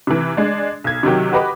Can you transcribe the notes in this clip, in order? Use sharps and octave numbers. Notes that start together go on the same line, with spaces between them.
C3 E3
G#3 D4
B1 G#6
C3 D#3 F#3 G4
F#4 G4 B4 D#5 B5 D6